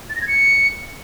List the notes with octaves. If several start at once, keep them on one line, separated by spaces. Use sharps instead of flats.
A6
A#6
G#6
C#7